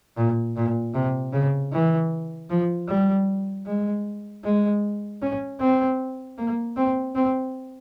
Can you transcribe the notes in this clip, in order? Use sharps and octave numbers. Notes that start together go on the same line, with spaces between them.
A#2
A#2
C3
C#3
E3
F3
G3
G#3
G#3
C#4
C4
A#3
C4
C4